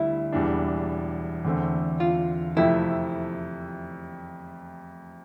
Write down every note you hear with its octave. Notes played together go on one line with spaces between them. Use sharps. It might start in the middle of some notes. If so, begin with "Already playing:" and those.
Already playing: D2 D3 G3 E4
E1 E2 E3 G3 D4
E2 D3 A3 C4
F4
F2 C3 F3 A3 E4